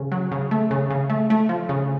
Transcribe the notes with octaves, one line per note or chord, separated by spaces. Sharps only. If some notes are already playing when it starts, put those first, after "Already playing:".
Already playing: C#3
F#3
C#3
A3
C#3
C#3
A3
A3
F3
C#3